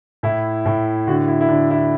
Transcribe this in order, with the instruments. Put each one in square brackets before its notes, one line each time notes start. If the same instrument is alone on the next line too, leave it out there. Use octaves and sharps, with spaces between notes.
[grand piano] A2 E4
A2
D3 F#4
E4
E4
D3 D4
E4